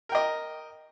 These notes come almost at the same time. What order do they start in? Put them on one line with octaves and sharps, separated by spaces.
A#4 G5 D#5